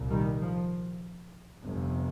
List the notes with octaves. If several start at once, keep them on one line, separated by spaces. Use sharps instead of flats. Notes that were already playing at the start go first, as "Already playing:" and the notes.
Already playing: C2 A#2
D#3 G3
F3
G1 F2 C3